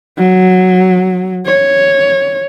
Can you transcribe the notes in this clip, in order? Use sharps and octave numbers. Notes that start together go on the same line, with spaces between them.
F#3
C#5